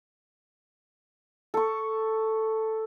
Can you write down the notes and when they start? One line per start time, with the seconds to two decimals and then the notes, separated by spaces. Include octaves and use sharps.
1.54 A4 C#6